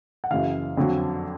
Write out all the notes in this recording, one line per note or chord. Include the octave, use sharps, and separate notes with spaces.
F#5
F#1 F#2 C#3 E3 F5
F2 D3 F#3